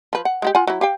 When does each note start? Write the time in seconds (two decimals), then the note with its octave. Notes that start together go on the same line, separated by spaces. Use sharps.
0.13 F3 B4
0.25 F#5
0.42 G#3 F#4 G4
0.55 F4 F#5 G#5
0.67 F#3 E4
0.81 G4 F5 G5